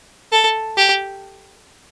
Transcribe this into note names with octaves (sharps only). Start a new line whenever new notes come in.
A4
G4